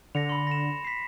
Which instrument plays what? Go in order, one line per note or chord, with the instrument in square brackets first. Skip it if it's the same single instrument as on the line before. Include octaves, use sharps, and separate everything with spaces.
[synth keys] D3 [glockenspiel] A#6 C#7 F7
[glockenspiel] B5 C6
A#6 E7
B6 C7